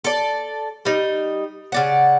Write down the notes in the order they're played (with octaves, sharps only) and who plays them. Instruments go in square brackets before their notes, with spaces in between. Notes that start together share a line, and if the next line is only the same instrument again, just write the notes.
[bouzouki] A4 D5
G3 D#4
C#3 D5 F#5